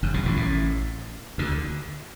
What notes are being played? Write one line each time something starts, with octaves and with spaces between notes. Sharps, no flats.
G1 G2
B1 B2
A1 A2
A1 A2
D2 D3